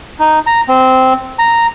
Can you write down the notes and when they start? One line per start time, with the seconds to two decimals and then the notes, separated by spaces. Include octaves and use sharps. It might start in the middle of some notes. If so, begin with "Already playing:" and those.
0.19 D#4
0.47 A#5
0.68 C4
1.39 A#5